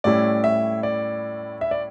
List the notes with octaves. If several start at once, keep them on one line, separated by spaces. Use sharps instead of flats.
A2 G3 C#4 E4 D5
E5
D5
E5
D5